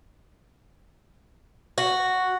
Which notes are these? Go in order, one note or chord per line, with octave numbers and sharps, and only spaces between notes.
F#4